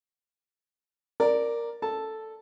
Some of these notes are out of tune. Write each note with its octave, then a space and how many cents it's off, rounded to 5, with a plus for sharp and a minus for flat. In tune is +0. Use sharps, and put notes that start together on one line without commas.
A#4 +0 D5 +0
A4 +0 A5 +0